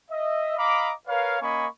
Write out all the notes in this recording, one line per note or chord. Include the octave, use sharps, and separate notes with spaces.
D#5 E5
D#5 F5 A#5 B5 D6
A#4 B4 C#5 F5
A#3 C#4 D#5 G#5 B5 C#6